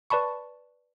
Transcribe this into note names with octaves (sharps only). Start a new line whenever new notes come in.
B4 D5 A5 B5 C#6